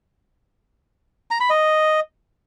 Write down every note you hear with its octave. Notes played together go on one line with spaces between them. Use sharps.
A#5
B5
D#5